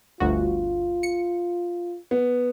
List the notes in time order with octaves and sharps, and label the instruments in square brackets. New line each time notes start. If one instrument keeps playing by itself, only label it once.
[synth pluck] G1 D2 F#4 [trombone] F4
[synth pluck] C#7
[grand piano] B3